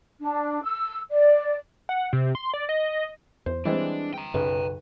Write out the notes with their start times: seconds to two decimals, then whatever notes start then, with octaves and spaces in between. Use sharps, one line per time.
0.21 D4
0.63 E6
1.11 D5
1.89 F#5
2.13 C3
2.35 C6
2.54 D5
2.69 D#5
3.46 E2 C5
3.65 E3 G3 G#3 C4 D4
4.14 G5 A#5
4.34 B1 F#2 C#3 B4